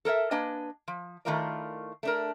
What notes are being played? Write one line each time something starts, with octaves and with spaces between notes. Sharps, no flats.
A4 A#4 C#5 E5
A#3 D4 B4 D#5 G#5
F3
D#3 A3 E4 F4 A#4 D5
A3 D4 A#4